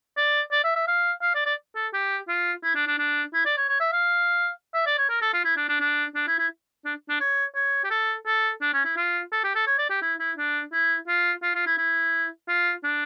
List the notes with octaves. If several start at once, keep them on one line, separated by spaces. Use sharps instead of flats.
D5
D5
E5
E5
F5
F5
D5
D5
A4
G4
F4
E4
D4
D4
D4
E4
D5
C#5
C#5
E5
F5
E5
D5
C#5
A#4
A4
F4
E4
D4
D4
D4
D4
E4
E4
D4
D4
C#5
C#5
G4
A4
A4
D4
C#4
E4
F4
A4
G4
A4
C#5
D5
G4
E4
E4
D4
E4
F4
F4
F4
E4
E4
F4
D4